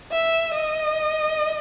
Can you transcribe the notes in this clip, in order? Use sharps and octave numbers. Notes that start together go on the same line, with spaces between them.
E5
D#5